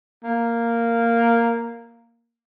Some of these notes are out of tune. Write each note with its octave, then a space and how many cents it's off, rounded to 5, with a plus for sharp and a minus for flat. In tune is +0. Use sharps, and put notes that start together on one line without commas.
A#3 -5